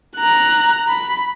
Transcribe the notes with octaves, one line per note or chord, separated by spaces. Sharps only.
A#5 F#6
B5